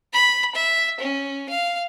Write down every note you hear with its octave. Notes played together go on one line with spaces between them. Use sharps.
B5
E5
C#4
F5